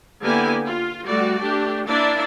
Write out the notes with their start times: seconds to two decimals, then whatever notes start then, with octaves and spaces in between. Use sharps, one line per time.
0.21 D3 A#3 B3 E4 G4 G#5
0.65 F4
1.05 G3 A3 F#4 D5
1.43 A3 D4 G4
1.87 A#3 D4 E4 D5 E5